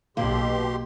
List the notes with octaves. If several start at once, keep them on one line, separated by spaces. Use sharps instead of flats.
B1 B2 A#3 G4 C6